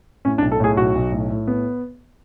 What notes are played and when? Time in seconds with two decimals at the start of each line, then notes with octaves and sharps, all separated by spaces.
0.25 A2 C#4
0.38 D4
0.42 B1
0.52 A4
0.60 A2 G#4
0.77 B1 F#4
0.95 B1
1.12 A2
1.30 A2
1.47 B3